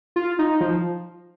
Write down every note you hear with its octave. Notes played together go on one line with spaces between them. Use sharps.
F4
D#4
F3